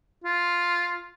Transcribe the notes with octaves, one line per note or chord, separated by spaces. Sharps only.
F4